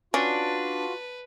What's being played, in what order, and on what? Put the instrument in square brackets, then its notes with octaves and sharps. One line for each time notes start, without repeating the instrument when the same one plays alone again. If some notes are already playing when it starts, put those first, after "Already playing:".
[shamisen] C#4 [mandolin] D4 [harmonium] F4 F#4 [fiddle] B4